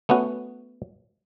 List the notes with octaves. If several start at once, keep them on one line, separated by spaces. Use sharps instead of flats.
A3 B3 C#4 F#4